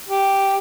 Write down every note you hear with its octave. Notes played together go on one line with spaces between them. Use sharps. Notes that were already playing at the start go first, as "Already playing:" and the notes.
G4